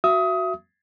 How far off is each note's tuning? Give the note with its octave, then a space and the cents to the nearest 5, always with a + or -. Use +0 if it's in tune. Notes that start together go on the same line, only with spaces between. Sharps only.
F#4 +0 E5 +25 D#6 +25